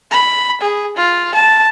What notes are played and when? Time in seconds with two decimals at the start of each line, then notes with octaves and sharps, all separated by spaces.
0.11 B5
0.61 G#4
0.97 F4
1.35 A5